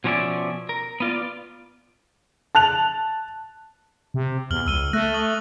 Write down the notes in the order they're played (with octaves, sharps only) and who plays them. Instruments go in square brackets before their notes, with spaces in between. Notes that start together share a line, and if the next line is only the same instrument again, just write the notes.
[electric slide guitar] B2 F3 C#4 A#4 D5 E5
A#4
B3 F4 D5
[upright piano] A5 F#6 F7
[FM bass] C3
[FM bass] E2 [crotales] F6 F#7 G7
[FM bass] C#2 [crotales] E6 D#7 G7
[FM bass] A3 [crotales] E6 F#6 A#6
[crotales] C#6 D#6 F#7